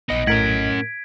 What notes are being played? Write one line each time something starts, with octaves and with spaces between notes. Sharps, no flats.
A#1 B3 D#4 D#5 A#6
A2 C#4 A#4 F#5 G#6 B6 D7